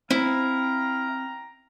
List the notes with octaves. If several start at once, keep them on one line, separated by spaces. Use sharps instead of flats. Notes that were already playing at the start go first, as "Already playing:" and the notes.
C4 E4 F5 G5 A#5